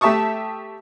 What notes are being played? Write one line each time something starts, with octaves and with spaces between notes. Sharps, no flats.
A3 G4 E5 A5 C#6 D#6